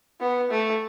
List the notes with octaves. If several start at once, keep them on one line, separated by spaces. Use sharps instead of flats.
B3
A3